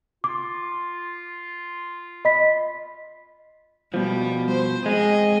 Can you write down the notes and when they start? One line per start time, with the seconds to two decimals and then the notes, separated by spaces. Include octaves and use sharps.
0.24 F4 D6
2.25 D#5 B5 B6
3.94 B2 F3 G3
4.51 C5
4.86 G#3 A#3 C4 G#4 D#5